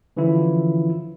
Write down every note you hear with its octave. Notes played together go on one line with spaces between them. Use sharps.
D3 E3 F3 C#4 E4 F4